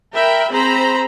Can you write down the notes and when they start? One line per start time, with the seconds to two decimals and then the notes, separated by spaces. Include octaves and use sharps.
0.13 A#4 E5 G5 B5
0.52 C4 G#4 C5 A#5 B5